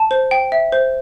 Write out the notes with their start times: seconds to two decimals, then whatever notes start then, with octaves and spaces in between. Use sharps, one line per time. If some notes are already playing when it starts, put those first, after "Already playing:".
Already playing: A5
0.11 C5
0.31 G5
0.52 E5
0.72 C5